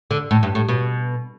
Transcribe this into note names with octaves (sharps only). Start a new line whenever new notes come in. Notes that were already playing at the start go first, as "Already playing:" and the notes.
D3
A2
G2
A2
B2